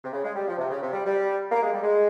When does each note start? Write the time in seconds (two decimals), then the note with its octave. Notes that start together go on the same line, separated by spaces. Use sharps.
0.04 C3
0.13 C#3
0.24 G#3
0.36 G3
0.48 F3
0.59 C3
0.71 C#3
0.83 C3
0.93 G3
1.06 G3
1.52 A#3
1.63 G#3
1.72 G3
1.83 G#3